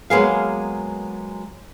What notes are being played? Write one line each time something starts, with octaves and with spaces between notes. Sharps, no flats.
F#3 G#3 A#3 B3 G#4 F5